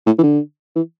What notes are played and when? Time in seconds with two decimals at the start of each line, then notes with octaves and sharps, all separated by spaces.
0.06 A2
0.19 E3
0.23 D3
0.76 E3